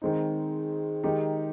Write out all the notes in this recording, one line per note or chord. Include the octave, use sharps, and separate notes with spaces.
D#3 G#3 C4 D#4
D#3 G#3 D#4 G4